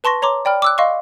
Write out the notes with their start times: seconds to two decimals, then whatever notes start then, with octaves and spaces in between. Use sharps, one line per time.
0.04 B4 A5 C6 C#6 A#6
0.22 C#5 A#5 C6 D6
0.45 D5 G5 B5 F6
0.62 D6 E6 F#6
0.78 D#5 F5 C6 C#6